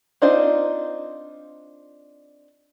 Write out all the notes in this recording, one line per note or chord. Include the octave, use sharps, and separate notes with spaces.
C4 D4 D#4 F4 C5